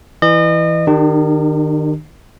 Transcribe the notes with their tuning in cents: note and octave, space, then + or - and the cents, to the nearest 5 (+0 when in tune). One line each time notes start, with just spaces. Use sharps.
E3 +0 D#5 -35
D#3 -20 D4 +40 G4 +0